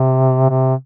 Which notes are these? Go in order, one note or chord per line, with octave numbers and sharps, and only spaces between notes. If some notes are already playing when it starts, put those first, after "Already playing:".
Already playing: C3
C3